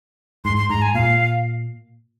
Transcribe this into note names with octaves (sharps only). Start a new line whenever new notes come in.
G#2 C6
C6
G#2 A#5
G#5
A#2 F5